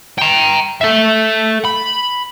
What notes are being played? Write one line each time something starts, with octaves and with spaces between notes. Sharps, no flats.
G5 A#5
A4 E5
B5